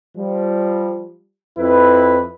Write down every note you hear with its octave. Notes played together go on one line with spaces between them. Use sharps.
F3 G3
F2 E4 B4